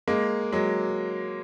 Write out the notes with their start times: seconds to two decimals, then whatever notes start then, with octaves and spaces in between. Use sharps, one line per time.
0.08 G#3 A#3
0.52 F#3 G#3